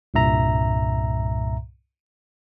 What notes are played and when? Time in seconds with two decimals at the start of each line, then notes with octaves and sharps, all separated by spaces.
0.14 C2 G2 A#2 E5 A#5